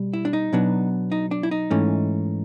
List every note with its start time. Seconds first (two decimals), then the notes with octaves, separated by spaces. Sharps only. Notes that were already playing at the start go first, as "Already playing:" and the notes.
Already playing: B2 G3
0.14 E4
0.25 D4
0.33 D#4
0.53 B2 F#3 B3 D4
1.12 D#4
1.31 D4
1.43 E4
1.51 D#4
1.71 G#2 E3 A3 C#4